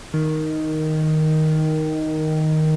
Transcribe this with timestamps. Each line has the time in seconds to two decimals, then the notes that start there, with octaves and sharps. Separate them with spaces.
0.13 D#3